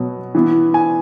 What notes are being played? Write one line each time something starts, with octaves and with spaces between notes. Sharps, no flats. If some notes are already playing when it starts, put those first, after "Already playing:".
Already playing: B2 F#3 B3
E3 B3
G#5